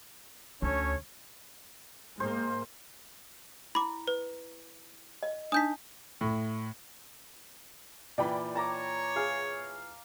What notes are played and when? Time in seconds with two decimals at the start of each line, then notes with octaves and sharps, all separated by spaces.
0.62 D2 C#4 A4 C#5
2.20 G#2 G#3 A#3 C5
3.75 E4 B5 D6
4.08 B4
5.23 D#5
5.52 D4 D#4 D#6 G6 B6
6.21 A2
8.18 A#2 E3 D5 G5 B5
8.55 C#5 A5 A#5 D6
9.16 G#4 F5